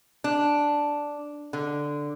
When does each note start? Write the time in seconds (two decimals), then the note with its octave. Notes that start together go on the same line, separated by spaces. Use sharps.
0.24 D4
1.53 D3